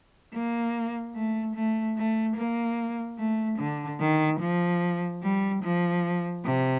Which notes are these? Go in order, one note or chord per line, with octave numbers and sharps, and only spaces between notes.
A#3
A3
A3
A3
A#3
A3
D3
D#3
F3
G3
F3
C3